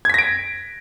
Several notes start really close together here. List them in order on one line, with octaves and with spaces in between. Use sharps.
G#6 B6 A#6 D7